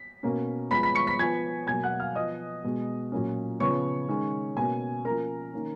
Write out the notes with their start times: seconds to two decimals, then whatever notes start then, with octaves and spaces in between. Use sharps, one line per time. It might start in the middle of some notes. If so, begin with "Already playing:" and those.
Already playing: B6
0.23 B2 A#3 C#4
0.71 F3 G#3 B3 B5 B6
0.83 B5 B6
0.95 C#6 C#7
1.07 B5 B6
1.19 F3 B3 G#5 G#6
1.67 B2 F#3 A#3 G#5 G#6
1.83 F#5 F#6
2.00 F5 F6
2.15 F3 B3 D#5 D#6
2.64 B2 G#3 B3
3.12 A#2 F#3 A#3 C#4
3.60 C#3 F3 B3 C#5 C#6
4.08 D#3 G#3 C#4
4.57 B2 A#3 C#4 G#5
5.05 F3 A#3 C#4 A#4 A#5
5.53 D#3 A#3 C#4